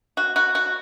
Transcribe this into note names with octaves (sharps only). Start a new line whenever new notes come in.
F#4
F#4
F#4